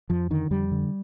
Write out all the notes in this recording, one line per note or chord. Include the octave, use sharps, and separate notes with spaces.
F2 F3
D3 D#3
F2 G3
D3